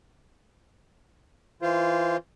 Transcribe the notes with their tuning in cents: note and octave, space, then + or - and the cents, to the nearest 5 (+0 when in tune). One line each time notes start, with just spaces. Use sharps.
E3 +0 F4 -20 C5 +0